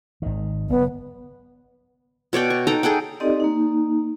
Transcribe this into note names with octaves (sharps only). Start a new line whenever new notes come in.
G#1 D#3
F#1 B3
B2 C#5 D5 G5
C#6
D#4 A4 G5 A#5
G#4 A4 F#5 G5
C4 D#4 G4 A4 D5 D#5
A#3 D#4